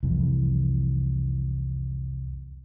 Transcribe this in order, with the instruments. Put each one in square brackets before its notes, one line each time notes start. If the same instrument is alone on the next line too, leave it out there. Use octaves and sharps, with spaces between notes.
[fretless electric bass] C2 F2 E3